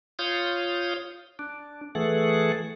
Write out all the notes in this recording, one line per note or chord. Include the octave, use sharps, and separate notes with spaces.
F4 C#5 F5 D#6 G6
D4
E3 A3 G#4 A4 F#5